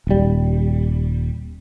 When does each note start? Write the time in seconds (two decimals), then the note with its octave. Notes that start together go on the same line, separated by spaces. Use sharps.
0.07 D#1 G3